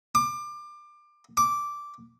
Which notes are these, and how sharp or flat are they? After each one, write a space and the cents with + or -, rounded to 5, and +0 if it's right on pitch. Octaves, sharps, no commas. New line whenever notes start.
D6 +25
D6 -5